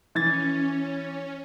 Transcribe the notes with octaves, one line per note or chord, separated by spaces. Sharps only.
E3 C#4 G#6 A6